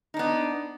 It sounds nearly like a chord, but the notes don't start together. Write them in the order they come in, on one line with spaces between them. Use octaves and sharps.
D#4 D4 B3